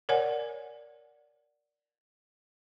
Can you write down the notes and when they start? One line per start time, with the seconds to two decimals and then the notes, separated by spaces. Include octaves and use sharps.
0.09 A#4 C#5 D5 F#5 G#5